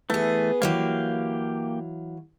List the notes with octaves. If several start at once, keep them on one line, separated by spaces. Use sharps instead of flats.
E3 A3 B3 G#4
E3 F#3 A#3 G4 F5